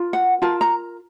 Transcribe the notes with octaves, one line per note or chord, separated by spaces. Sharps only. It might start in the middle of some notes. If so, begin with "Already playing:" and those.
Already playing: F4 A#4
F#5
F4 A#4 A5
A#5